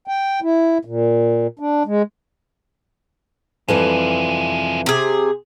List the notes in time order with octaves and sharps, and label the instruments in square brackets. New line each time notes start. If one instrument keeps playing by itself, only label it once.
[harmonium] G5
E4
A#2
D4
G#3
[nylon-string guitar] F2 E3 G3 [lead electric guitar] C3 G#3
[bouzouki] C3 G#4